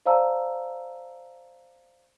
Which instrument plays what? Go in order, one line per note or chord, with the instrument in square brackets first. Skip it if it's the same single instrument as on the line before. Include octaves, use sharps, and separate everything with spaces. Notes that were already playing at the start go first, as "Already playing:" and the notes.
[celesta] C5 D5 F5 A5 A#5 E6